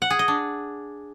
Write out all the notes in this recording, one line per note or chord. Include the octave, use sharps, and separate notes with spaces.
F#5
G#4
D#5
D4